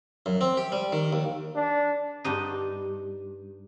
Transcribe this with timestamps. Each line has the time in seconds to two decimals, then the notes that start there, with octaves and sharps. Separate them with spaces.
0.26 F#2
0.41 C4
0.57 G4
0.72 G3
0.92 D#3
1.13 D#2
1.55 D4
2.24 G2 D4 D#4